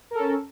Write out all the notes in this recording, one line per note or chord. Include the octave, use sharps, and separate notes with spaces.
C#4 A4 A#4